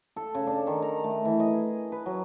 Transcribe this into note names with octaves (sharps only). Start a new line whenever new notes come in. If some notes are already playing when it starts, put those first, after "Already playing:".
A4
C#3
D4
D#3
A#5
A3
E3
D#5
G#4
B4
F#3